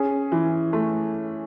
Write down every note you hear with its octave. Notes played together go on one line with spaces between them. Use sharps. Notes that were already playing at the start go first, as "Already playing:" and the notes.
Already playing: C#4 G#4
E3
A3